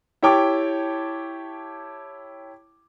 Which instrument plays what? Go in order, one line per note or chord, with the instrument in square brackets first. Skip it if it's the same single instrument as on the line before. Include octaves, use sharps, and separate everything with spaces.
[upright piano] E4 G4 C#5 G5 A5 D6